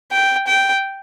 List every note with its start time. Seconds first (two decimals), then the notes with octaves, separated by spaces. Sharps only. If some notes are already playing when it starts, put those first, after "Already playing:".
0.12 G5
0.47 G5